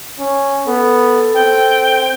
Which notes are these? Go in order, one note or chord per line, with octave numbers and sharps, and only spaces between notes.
C#4
B3 A4
C4 G5